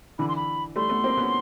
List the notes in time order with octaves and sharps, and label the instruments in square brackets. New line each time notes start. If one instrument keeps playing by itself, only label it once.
[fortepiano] D3 E3 [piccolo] B5
[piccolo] C6
B5
[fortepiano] G3 A3 [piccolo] C6
[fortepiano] A3 B3
A#3 C4
B3 C#4